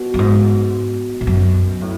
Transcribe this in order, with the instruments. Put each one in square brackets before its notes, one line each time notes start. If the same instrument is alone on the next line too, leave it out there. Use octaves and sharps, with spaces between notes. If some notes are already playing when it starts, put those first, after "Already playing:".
Already playing: [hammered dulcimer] B2
[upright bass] F#2
G#2
G#2
F#2
[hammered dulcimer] A2